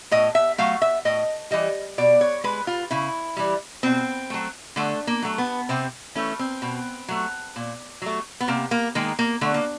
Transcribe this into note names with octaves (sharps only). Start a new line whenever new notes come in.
A2 D#5
E5
F#3 A3 F5
E5
A2 D#5
E3 G3 D#5
B2 D5
C#5
G#3 B4
F4
C#3 E4
E3 G3
B2 C4
F#3 A3
D3 A3
A#3
F#3 A3
B3
C3 C4
E3 A3 C#4
C4
B2
F#3 A3
A#2
F#3 A3
B3
C3 A#3
A#3
D#3 G#3 A#3
A#3
D3 A3
A#3